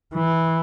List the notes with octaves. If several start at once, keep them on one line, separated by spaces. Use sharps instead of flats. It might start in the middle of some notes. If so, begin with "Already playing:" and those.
E3